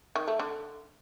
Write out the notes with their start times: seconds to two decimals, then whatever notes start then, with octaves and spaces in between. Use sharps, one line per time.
0.15 D#3
0.27 A3
0.39 D3